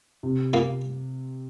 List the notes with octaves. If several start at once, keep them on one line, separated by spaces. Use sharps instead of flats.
C3
A#2 A#3